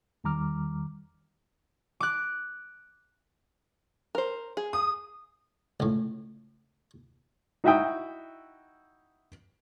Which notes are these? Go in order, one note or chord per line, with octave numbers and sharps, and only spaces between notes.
E2 D#3 G3 A#5 D6 F6
D6 F#6
A#4 C5
G#4
D#6
C#2 A2
D#4 E4 F#4 E5 G5 D#6